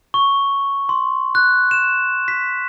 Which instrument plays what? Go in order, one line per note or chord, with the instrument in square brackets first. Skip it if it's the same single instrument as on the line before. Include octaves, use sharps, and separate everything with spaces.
[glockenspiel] C#6
C6
F#6
E7
B6